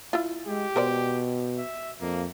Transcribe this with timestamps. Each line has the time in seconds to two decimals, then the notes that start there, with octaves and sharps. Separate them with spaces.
0.13 E4 F4
0.47 G#3 G4
0.76 B2 A#4 C5 D5
1.57 E5
2.01 F2 A#3